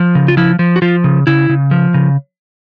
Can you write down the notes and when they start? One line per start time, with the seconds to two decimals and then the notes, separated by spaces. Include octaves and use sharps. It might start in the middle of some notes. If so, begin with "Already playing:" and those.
Already playing: F3
0.15 C#3
0.28 F4
0.37 F3 E4
0.59 F3
0.76 F#4
0.82 F3 F4
1.04 C#3
1.27 C#3 E4
1.49 C#3
1.71 F3
1.94 C#3